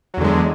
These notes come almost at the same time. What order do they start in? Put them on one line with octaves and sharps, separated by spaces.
F#3 E2 D3 G#3